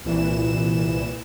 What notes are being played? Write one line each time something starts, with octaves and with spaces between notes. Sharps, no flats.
C2 A#2 E3 E7